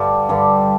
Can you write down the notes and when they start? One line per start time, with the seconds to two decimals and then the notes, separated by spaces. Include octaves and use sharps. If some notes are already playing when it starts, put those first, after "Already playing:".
Already playing: G2 D3 G3
0.29 G2 D3 G3